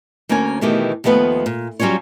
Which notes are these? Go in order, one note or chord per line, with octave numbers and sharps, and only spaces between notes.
D2 A#3 C#4 C#5 G#5
B2 D#3 E3 A3 G4
D#2 F3 A3 B3 B4
A#2
F#3 G3 C#4 F4 C#5